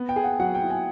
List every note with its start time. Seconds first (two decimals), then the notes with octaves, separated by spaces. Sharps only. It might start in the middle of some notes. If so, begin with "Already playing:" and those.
Already playing: B3
0.09 G5
0.16 G#4
0.24 F#5
0.39 F#3 F#5
0.55 G5
0.62 E4
0.70 G#5